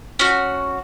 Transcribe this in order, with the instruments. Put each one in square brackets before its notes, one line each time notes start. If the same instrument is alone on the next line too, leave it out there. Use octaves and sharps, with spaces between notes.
[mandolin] C#4 F#4